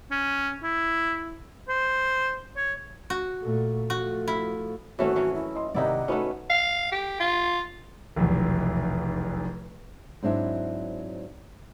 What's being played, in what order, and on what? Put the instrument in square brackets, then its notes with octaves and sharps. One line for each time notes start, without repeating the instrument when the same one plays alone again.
[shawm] C#4
E4
C5
C#5
[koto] F#4
[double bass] A#2 A3
[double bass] F3 A3 [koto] F#4
[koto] E4
[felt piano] G#1 C4 C#5 [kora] E3 A3 C#4 [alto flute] F#4
[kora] E3 F#3 C#4
[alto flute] E4
[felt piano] D#5 C6
[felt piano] G#1 C3 [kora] D#4 E4 D5 [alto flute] F#5
[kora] A3 B3 C#4 [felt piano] D#4 F#4 B4
[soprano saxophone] F5
G4
F4
[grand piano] F1 B1 E2
[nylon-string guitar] G#2 F#3 C4 D4 E4